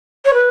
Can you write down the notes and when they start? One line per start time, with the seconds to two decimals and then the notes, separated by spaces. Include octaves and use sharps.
0.25 C#5
0.33 B4